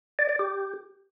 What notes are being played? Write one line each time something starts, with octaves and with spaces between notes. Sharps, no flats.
D5
D5
G4